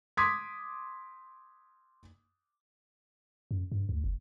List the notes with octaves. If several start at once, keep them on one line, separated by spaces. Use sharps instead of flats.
C6 D6 D#6 G#6 B6
F#2
G2
D2
F#1